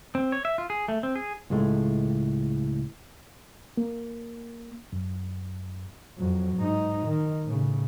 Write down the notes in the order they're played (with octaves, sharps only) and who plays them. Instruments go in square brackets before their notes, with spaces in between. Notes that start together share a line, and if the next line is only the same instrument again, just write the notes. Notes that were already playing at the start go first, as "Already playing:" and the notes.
[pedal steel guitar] C4
C#5
E5
F4
G#4
A3
C4
G#4
[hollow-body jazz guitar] C#2 A2 G#3 A3
[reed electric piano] A#3
F#2
[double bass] F2 F#3
G#2 D#4
D#3
A2 C#3